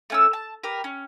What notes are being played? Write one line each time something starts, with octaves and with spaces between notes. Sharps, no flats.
A3 C#4 E6
A5
G4 A#4 B4
C#4